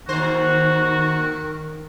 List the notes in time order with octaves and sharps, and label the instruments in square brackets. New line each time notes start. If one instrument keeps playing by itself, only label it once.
[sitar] D#2 C5 [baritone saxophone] D#3 [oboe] F#4